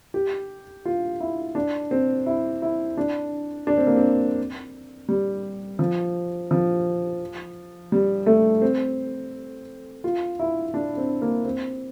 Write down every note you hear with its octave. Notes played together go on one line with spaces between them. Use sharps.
G4
F4
E4
D4
C4
E4
E4
D4
D4
C4
A#3
C4
G3
F3
F3
G3
A3
C4
F4
E4
D4
C4
A#3
C4